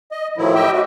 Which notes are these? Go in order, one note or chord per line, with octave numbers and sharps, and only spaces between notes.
D#5
A2 D#3 F3 F#3 E4
G4 D#5 E5 G5
F#4